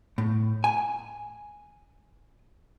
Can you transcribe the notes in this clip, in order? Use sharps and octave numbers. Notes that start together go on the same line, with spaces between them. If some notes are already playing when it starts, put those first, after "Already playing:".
A2
G#5